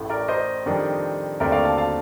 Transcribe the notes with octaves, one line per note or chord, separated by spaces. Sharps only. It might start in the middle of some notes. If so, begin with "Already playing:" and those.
Already playing: A1 A2 A3
A#4 D5
C5 D#5
F2 D#3 G3 D4
D#2 D3 A3 C4 A#4 D5
D5 F5
F5 A5
F5 A5